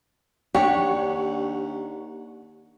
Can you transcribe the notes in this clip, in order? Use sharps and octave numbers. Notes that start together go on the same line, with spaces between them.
D#2 D4 G4 C#5 F#5 C#6